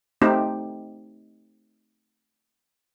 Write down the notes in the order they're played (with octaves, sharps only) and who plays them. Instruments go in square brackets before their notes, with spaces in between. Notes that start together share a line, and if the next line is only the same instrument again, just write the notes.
[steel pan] A3 C4 D#4 G4